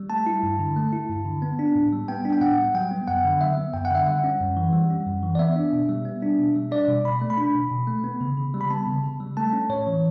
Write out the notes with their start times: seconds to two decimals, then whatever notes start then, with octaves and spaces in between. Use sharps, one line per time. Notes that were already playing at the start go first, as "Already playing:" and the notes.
Already playing: G3
0.10 A3 A5
0.26 E4
0.43 G2
0.59 D3
0.76 A3
0.92 E4
1.10 G2
1.25 D3
1.42 B3
1.59 D4
1.76 A2
1.92 G3
2.08 B3 G5
2.25 D4
2.33 G5
2.41 A2 F#5
2.58 G3
2.75 F#3 G5
2.91 B3
3.08 F#2 F#5
3.25 D3
3.41 F#3 E5
3.57 B3
3.74 F#2 G5
3.85 F#5
3.90 D3 E5
4.06 G3 F#5
4.24 C#4
4.40 F#2
4.57 E3
4.73 G3
4.90 C#4
5.06 F#2
5.23 E3
5.35 D5
5.39 B3 E5
5.56 D4
5.73 B2
5.89 G3
6.05 B3
6.23 D4
6.39 B2
6.56 G3
6.72 D4 D5
6.88 B2
7.04 B2 B5
7.21 A3
7.30 B5
7.38 D4
7.55 B2
7.71 B2
7.87 A3
8.04 B3
8.21 C#3
8.38 C#3
8.54 G3
8.61 B5
8.70 B3 A5
8.87 C#3
9.04 C#3
9.20 G3
9.37 A3 A5
9.53 C#4
9.69 A2 C#5
9.87 E3